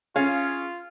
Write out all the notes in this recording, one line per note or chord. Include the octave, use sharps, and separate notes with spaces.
C#4 F4 G#4 F5